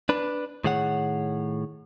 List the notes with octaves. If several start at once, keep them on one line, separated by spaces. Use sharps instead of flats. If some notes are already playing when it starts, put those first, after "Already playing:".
D4 B4
A2 D#3 G#4 C#5 F#5